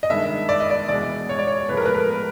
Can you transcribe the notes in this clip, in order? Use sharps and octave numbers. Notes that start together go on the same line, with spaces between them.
D#5
G2 D#3 G#3 E5
D5
D#5
D5
E2 B2 G#3 D5
C#5
D5
C#5
A2 F3 G#3 B4
A#4
B4
A#4